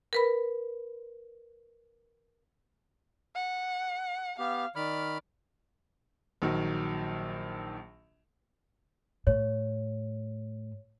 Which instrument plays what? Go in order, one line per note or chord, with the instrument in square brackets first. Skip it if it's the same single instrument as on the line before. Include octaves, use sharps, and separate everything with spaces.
[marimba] A#4 B4 B5
[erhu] F#5
[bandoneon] B3 G4 [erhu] F5
[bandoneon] D#3 B5 F6 [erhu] D5
[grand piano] A#1 D#3 F#3
[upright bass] A2 [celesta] C#5